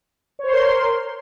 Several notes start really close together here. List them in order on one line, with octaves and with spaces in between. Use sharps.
C#5 C5 C6 A#4